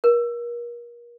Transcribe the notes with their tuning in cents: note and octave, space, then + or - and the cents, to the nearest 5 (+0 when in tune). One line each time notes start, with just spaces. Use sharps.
A#4 +35